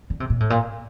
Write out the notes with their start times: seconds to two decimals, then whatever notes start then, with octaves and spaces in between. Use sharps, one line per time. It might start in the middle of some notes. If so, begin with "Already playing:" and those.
0.10 D3
0.20 C3
0.30 A#2
0.40 A2
0.50 A#2